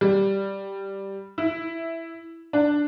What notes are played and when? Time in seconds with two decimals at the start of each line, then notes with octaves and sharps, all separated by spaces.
0.01 G3
1.38 E4
2.53 D4